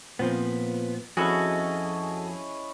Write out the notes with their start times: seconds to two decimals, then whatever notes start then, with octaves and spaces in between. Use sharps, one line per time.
0.19 A#2 F3 B3 C4
1.17 F2 C#4 E4 F#4 G#4 A4 D#5